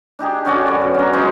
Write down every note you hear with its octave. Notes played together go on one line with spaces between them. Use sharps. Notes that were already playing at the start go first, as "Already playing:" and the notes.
D4 D#4 G4 G#4
D3 C#4 F#4 D5
F#2 D5
B2
C#4 A#5
F3 G#3 D#4